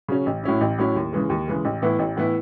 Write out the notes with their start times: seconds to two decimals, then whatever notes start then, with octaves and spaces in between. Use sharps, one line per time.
0.08 C#3 F#3 C#4
0.26 A1
0.44 A2 F#3 C#4 E4
0.61 A1
0.78 A2 F#3 C#4 E4
0.96 D#2
1.13 C#3 E3 G#3
1.30 D#2
1.48 C#3 E3 G#3
1.65 A1
1.82 A2 E3 B3 E4
1.99 A1
2.17 A2 E3 B3 E4